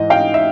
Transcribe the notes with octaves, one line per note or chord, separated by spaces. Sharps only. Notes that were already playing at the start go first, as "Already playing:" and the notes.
Already playing: G#2 E3 D#5
F5 G5
E5